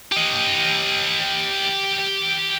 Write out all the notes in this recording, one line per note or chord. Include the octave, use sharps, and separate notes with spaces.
G4 D#5